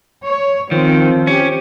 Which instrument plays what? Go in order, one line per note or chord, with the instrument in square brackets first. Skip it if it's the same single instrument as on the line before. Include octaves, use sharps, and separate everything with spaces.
[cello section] C#5
[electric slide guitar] D#3 [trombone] F3 [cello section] C4
[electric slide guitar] C#4 [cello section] G4